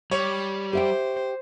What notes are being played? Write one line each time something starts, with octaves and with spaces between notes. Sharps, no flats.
G3 C#5
G4 C5 E5 G5